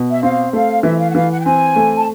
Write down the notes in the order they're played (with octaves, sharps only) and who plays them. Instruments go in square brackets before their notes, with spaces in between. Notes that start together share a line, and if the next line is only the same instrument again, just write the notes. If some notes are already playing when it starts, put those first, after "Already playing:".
Already playing: [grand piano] B2
[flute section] E5
[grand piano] C4 [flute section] F5
[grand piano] A3 [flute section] F5
[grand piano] E3 [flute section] E5
[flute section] F5
F#5
[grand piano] E3 [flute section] F5
[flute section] F#5
G5
[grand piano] C4 [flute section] G#5
[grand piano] A3
[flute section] A5